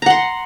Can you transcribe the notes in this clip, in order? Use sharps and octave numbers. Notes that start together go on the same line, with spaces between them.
F#5 A#5 C6